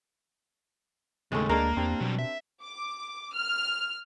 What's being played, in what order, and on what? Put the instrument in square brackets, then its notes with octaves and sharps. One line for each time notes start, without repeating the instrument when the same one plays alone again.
[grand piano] D#2 [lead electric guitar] A2 C#3 [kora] G#3 A3
[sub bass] D2 [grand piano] G#3 D4 [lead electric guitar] A#3 [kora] A#4 F5
[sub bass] E2 [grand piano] C4 D4 G4
[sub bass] B2 [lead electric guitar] F#3 G3
[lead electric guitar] E5
[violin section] D6
F6